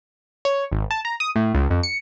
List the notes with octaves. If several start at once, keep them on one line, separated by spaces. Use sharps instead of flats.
C#5
G#1
A5
A#5
D#6
A2
C#2
F2
C#7